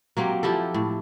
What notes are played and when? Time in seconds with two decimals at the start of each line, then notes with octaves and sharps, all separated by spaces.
0.17 F#3 A#3 C4 G4
0.43 F3 E4 G4 A4
0.74 A2